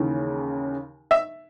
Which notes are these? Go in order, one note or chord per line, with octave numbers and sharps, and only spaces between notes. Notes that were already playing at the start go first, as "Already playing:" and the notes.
Already playing: D#2 C#3 E3
E5